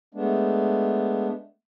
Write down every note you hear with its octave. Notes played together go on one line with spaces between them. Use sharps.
G#3 A3 B3 D4